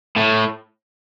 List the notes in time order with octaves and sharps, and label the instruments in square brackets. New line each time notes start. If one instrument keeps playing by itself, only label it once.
[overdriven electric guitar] A2